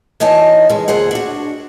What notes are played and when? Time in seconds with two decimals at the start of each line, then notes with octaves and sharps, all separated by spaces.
0.20 E3 D#4 C#5 D#5 G#5 A5
0.70 E2 G#3
0.88 D2 A#2 G#4 C5 F#5
1.11 D4 F#4